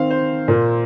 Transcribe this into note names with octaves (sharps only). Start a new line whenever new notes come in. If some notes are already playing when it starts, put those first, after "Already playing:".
Already playing: D#3 C4 F5
C5
A#2 A#3